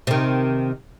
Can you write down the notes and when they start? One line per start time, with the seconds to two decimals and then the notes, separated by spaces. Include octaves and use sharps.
0.07 C3 D#3